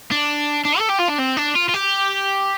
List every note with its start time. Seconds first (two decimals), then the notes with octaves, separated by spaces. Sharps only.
0.11 D4
0.65 D4
0.79 A4
0.90 G4
1.00 F4
1.09 D4
1.19 C4
1.37 D4
1.55 F4
1.69 F4
1.74 G4